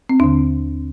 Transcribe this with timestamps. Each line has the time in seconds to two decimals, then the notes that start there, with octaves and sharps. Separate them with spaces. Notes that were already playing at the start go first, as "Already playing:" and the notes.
0.09 C4
0.20 D#2 D3 D4